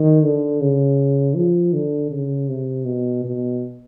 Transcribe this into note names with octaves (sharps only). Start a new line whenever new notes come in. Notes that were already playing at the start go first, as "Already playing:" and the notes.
Already playing: D#3
D3
C#3
F3
D3
C#3
C3
B2
B2